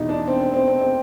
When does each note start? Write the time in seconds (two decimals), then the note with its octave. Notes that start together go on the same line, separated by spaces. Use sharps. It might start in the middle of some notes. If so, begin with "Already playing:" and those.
Already playing: E2 B2 D#4 E4
0.09 D4
0.28 C4
0.41 C4
0.54 C4
0.68 C4
0.81 C4